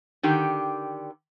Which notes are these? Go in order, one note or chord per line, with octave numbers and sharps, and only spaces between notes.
D3 D#3 G4